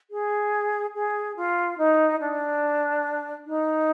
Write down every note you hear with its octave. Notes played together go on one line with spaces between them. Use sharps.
G#4
G#4
F4
D#4
D4
D#4